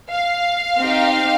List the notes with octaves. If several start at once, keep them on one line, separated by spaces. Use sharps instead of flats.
F5
C4 D#4 G4